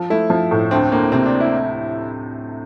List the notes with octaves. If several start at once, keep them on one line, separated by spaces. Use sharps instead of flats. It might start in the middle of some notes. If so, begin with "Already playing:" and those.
Already playing: F3
A3 E4
F3
A2
D2 C4
D2 A#3
C3 C4
D4
E4